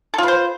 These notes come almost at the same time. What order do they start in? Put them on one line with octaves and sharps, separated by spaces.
A4 F4 B4 C5